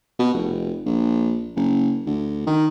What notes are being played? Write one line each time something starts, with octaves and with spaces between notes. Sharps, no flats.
B2
F1
A#1
F#1
D2
D#3